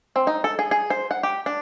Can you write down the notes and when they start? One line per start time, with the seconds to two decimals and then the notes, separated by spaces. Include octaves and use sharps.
0.16 C4
0.27 D#4
0.44 A4
0.59 G#4
0.71 G#4
0.90 C5
1.11 F#5
1.23 G4
1.46 D4